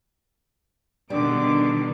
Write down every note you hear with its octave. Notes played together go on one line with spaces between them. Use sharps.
B2 D3 D#3 G3 D4 D6